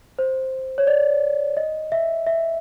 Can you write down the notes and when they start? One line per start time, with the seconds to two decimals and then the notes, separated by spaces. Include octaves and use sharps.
0.19 C5
0.78 C#5
0.87 D5
1.57 D#5
1.92 E5
2.27 E5